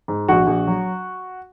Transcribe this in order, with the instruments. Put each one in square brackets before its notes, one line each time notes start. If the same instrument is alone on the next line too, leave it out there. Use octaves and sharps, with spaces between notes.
[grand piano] G#2
A#1 F#4
A#1
F#3